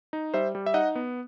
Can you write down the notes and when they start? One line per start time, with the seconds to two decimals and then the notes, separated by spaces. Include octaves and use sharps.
0.13 D#4
0.34 G3 C5 E5
0.55 G3
0.66 E5
0.74 D#4 D#5 F#5
0.95 B3